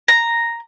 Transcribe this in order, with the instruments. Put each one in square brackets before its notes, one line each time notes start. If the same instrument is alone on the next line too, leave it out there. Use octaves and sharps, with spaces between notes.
[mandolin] A#5